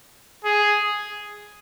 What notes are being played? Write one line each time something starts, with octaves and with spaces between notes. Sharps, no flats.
G#4